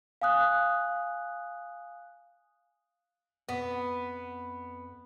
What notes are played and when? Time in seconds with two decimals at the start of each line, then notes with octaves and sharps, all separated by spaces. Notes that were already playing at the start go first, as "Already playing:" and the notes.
0.22 F5 G#5 D#6 F#6
3.49 F2 B3